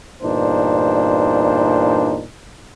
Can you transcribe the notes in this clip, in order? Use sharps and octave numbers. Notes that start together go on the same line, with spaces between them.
E2 G2 A#2 D4 D#4 C5